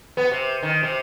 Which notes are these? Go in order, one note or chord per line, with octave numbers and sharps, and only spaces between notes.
B3
C3
D#3
C3